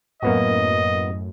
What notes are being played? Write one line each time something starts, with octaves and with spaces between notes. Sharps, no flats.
F#2 A2 A#3 B3 F#4 D#5